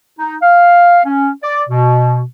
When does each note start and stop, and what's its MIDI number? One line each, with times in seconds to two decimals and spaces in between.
0.19 0.35 63
0.42 1.00 77
1.04 1.29 61
1.43 1.62 74
1.69 2.21 47